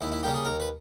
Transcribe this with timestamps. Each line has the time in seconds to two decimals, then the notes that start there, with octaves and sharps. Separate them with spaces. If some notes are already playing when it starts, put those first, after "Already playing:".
0.01 D#2 E4
0.12 E4
0.23 C#3 G3 A#3 G4
0.34 G#4
0.45 D#2 A#4
0.60 B4